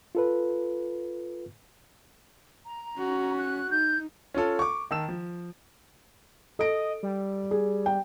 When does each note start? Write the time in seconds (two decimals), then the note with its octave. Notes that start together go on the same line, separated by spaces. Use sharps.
0.15 F4 A4 B4
2.65 A#5
2.97 C#4 F#4
3.38 F#6
3.71 D#4 G6
4.34 C#4 F4 A4
4.59 C#6 D6
4.91 D#3 A5 E6 E7
5.09 F3
6.59 A4 D#5 D7
7.03 G3
7.51 G#4
7.86 G5